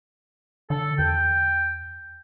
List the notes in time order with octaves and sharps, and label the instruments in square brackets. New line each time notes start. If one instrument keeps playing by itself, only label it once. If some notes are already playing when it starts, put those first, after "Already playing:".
[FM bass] D3 [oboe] A4
[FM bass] E2 [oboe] G5